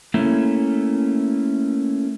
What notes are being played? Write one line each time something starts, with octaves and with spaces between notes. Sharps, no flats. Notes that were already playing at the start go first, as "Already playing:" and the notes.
A3 A#3 C#4 E4